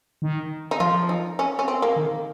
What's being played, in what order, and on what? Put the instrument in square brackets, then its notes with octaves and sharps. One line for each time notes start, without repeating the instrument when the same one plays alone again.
[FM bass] D#3
[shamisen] D#4
[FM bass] F3 [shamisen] F4
[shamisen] D#4
C#4
C#4
C4
A#3
[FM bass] D#3